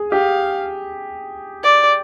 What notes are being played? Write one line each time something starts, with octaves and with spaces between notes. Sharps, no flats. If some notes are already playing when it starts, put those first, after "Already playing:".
Already playing: G#4
G4 F5
D5